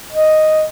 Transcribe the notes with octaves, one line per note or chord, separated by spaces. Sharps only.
D#5